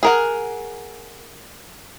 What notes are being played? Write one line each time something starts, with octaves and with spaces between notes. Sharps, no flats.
G#4 A#4 F#5